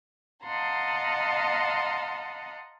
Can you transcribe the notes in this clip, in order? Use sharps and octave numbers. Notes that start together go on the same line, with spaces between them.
D#5 F5 F#5 A5 A#5 C6